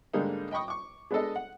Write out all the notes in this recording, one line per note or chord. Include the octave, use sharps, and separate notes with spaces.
G#2 D3 G3 G#3 A#3 D#4
D#5 G5 B5 C#6 D#6
C#6 D6
G#3 B3 D4 G#4 A4 D#5
F#5